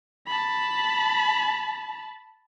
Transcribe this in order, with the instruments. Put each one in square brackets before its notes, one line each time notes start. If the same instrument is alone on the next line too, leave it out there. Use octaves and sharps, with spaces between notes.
[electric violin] A5 B5